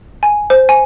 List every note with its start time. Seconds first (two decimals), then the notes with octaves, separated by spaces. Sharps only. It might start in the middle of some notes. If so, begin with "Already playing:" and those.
0.23 G#5
0.50 C5
0.69 G#5